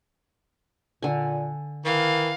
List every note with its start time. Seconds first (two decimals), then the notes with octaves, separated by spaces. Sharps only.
1.03 A#2 D3 G#5
1.85 D#3 E3 F5